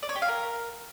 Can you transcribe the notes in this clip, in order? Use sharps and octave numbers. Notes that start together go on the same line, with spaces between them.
D5
C#5
G4
F5
A#4